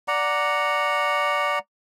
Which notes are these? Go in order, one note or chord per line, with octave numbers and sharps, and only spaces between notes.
D5 F#5 A#5